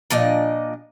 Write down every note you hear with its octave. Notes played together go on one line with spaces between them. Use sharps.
A#2 F3 D4 D#5